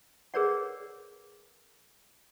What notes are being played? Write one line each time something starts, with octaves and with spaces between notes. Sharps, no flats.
G#4 A#4 B4 C#5 D5 F#5